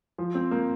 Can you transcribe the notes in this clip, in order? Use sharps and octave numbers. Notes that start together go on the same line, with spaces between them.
F3
C4
A#3